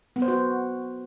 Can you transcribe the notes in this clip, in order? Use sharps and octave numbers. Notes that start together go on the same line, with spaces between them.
B3
C5
F#4